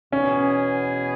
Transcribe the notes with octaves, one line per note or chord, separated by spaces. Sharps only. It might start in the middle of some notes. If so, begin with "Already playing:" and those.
E2 B2 B3 C#4 G#4